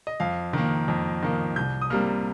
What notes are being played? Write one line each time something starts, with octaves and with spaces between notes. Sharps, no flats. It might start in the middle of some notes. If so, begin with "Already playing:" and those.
D#5
F2 F5
D#3 A#3
F2
D#3 A#3
C2 G6
D#6
C3 G3 A#3 F6